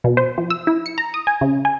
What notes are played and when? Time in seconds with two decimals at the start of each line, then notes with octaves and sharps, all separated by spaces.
0.04 B2
0.17 C5
0.38 F3
0.50 E6
0.67 E4
0.86 C#7
0.98 A#5
1.14 D#6
1.27 G#5
1.41 C#3
1.65 G#5